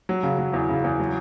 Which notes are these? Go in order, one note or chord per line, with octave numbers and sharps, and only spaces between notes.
F#3
C#3
F#3
E2
C#3
E2
F#3